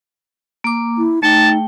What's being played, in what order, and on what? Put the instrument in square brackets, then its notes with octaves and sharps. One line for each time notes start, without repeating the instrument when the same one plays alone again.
[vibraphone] A#3 D6
[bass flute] E4
[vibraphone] A3 G#4 G5 [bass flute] D#4 [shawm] A5